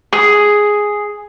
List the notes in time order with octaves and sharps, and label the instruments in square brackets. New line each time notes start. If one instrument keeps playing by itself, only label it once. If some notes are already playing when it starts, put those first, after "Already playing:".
[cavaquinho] G#4